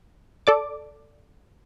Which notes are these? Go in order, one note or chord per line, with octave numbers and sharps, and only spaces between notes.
A4 D5 D6